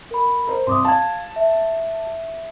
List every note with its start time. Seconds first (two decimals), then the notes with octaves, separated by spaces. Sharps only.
0.11 A#4 B5
0.47 A#4 C5
0.67 C2 C6 D6 D#6
0.85 F5 A5 G#6
1.36 E5